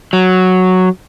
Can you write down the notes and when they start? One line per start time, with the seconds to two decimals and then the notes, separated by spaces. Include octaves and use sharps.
0.13 F#3